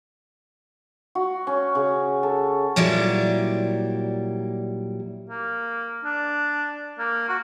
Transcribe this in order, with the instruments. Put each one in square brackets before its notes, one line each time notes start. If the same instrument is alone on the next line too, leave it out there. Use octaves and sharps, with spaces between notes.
[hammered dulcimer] F#4
C#4
C#3
A4
[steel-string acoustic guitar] A#2 F#3 G3 E4 D5
[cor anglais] A#3
D4
A#3
F#4